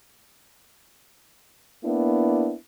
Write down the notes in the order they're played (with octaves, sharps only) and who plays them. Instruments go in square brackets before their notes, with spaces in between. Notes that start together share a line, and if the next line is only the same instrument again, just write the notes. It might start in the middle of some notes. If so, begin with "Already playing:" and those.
[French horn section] A#3 B3 D4 E4